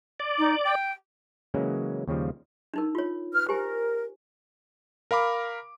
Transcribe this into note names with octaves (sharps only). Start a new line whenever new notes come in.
D5
D#4
G5
C#3 E3 F#3 G#3 A#3 C#4
D#2 C#3 F3 G3
D4 D#4 A#4
F4 C#5
B4 F6
G4 A#4 C5 G#5
A#4 F5 B5 D6